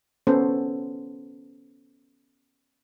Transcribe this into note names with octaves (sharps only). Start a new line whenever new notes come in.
B3 C#4 A4 C5